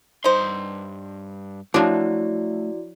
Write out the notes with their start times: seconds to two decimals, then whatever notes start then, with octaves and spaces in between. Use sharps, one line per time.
0.24 G2 D#4 C5 C6
1.74 F3 F#3 A3 D4 E4 F#4 D5